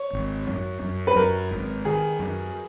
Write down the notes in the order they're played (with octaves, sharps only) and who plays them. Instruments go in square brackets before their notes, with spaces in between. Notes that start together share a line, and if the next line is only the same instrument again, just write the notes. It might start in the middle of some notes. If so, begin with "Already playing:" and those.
Already playing: [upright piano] C#5
[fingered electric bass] G#1
F#2
F#2
[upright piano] B4
[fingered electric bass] F#2 [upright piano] A#4
[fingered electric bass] G#1
[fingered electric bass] D#3 [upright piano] G#4
[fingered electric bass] F#2